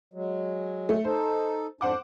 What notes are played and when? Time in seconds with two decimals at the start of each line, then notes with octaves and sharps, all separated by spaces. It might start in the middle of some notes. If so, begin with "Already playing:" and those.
0.14 F#3 G#3
0.89 A3
1.04 D#4 A4 C5
1.81 F2 G#2 D4 C5 F#5 D6